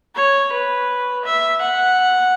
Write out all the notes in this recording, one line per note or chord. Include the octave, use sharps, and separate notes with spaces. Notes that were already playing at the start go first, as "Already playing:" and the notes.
C#5
B4
E5
F#5